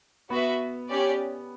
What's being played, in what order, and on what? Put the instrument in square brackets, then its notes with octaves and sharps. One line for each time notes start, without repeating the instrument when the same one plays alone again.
[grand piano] B3 [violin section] F#4 B4 E5
[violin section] C#4 G4 D5